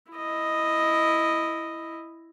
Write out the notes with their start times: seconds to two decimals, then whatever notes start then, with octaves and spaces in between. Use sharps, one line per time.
0.12 E4 D#5